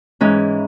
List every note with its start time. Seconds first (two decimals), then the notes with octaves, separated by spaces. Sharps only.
0.21 G#2 E3 C#4